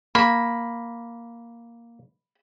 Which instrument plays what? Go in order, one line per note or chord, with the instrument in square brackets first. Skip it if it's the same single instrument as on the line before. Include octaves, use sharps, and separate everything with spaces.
[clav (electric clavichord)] A#3 [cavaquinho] B5